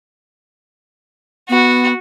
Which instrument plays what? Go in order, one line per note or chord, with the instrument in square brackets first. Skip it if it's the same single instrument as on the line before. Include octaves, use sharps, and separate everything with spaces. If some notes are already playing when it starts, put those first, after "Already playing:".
[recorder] B3 [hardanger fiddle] F#4